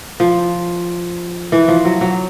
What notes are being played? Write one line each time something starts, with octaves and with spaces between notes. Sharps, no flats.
F3
E3
F3
F#3
F#3